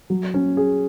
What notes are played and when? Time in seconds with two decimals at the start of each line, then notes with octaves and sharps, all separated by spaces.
0.10 F#3
0.34 C#4
0.57 G#4